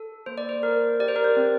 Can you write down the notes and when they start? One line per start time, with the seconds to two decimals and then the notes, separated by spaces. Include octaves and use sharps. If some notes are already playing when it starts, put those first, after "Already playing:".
Already playing: A4
0.26 A#3 C5
0.38 D5
0.49 C5
0.63 A4 A#4
0.99 G4 D5
1.08 C5
1.16 A#4
1.24 C5
1.37 C4